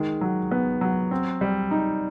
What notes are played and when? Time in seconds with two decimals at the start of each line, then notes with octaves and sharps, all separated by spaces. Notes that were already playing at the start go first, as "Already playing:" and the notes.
Already playing: D#3 G#3
0.21 F#3
0.51 B3
0.81 F#3
1.11 C4
1.41 G3
1.71 D#4